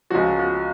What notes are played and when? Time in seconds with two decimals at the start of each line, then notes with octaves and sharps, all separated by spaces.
0.10 C#2 C#3 F3 F#4
0.39 F#4